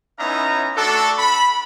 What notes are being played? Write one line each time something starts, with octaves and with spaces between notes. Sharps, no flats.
B3 C#4 D#4 E4 E5 A#5
A3 D4 F#4 A4
B5